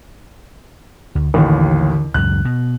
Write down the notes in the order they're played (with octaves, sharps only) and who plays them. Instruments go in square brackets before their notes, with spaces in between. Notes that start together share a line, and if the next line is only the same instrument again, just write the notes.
[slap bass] D2
[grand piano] A1 D#2 [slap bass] D3 D#3
[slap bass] C#2 F#2 A2 [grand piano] F#6
[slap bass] B2